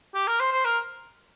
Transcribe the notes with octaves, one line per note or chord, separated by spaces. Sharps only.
G4
A#4
C5
C5
A#4